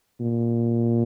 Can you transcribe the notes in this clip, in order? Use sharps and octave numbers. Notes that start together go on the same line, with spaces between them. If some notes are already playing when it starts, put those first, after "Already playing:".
A#2